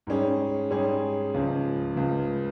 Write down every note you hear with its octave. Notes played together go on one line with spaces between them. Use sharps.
G#2 G3 C#4 G#4
G#2 G3 C#4 G#4
C#2 C#3 F3
C#2 C#3 F3